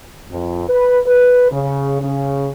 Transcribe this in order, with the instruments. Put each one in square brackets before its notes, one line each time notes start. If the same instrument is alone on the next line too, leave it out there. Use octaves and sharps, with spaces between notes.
[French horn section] F2
B4
B4
C#3
C#3